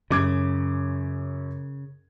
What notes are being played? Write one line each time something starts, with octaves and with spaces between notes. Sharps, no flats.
F#2 C#3 D6 G#6